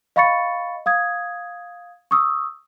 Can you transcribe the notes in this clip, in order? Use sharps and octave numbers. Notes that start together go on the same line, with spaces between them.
D#5 F5 B5 C#6 A6 C#7
F5 D#6 G#6
C#6 D#6 E6